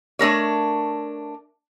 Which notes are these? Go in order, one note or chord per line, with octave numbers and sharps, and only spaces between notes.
A3 D4 A#4 C#5